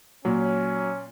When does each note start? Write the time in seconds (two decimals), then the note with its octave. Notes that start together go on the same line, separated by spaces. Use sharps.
0.25 A#2 F#3 C#4